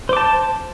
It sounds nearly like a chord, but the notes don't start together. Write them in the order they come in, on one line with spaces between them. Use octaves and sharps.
C5 D6 A5